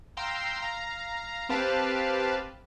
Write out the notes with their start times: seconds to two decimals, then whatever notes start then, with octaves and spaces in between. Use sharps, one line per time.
0.17 F5 G5 A#5 C6 E6
0.62 F5 A#5
1.49 C4 G4 B4 F5 A5